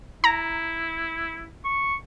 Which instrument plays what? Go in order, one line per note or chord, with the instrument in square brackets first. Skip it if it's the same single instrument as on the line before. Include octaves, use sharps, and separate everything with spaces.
[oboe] E4 [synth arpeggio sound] A#5
[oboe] C#6